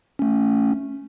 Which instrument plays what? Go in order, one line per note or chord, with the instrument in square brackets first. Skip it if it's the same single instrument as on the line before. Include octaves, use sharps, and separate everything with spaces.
[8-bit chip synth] A3 C#4